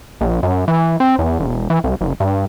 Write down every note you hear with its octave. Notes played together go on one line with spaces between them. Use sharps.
A#1
F#2
E3
C4
E2
E1
E3
C2
F#1
G2